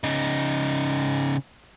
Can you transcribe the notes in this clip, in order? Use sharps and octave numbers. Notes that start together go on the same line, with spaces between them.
C#3 D#4